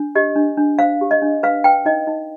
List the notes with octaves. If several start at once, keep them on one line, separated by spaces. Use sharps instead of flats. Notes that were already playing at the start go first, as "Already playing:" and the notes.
Already playing: D4
G4 D#5
D4
D4
C5 F5
G4
D#5
D4
B4 F5
B4 G5
D#4 D#5
D#4